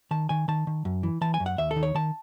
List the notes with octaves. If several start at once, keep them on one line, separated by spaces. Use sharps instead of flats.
D#3 A5
D#3 G#5
D#3 A5
D#3
F#2
E3
E3 A5
G#5
F#2
F#5
D#2 E5
A4
D#3
C#5
D#3 A5